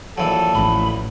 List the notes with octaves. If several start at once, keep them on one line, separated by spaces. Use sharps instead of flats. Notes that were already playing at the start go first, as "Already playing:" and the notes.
A#1 E3 F#3 A4
A1 B5